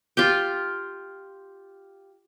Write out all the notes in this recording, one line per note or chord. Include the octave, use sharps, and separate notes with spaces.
F4 G4 G5